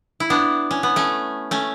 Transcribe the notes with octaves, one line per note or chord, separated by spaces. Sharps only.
E4
B3 D4
C#4
B3
A3 C#4
A3 C#4